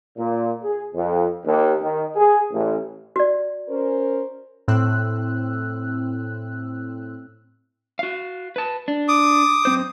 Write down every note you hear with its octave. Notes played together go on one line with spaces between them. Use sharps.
A#2
G#4
F2
D#2
D#3
G#4
A1
F#4 D5
C#4 A#4 C5
A2 C4 E6 F#6
F#4 F5
B4 A5
D4
D6 D#6
F#2 C4 C5